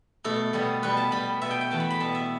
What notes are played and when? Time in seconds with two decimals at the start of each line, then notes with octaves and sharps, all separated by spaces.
0.24 B2 A3 A4
0.53 B2 G3 B3
0.83 B2 G3 B3 B4
0.97 A5
1.11 B2 G3 B3 B5
1.41 B2 G3 B3 E5
1.51 G5
1.61 G5
1.71 E2 E3 A3 A5
1.80 B5
1.90 B5
2.00 B2 G3 B3 A5
2.15 E5